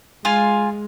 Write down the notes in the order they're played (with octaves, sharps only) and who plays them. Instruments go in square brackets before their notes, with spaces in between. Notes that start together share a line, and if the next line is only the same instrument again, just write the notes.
[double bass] G#3 [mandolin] F4 F5 G#5